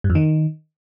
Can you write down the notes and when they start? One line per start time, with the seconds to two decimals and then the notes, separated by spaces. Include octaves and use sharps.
0.04 G2
0.10 F2
0.15 D#3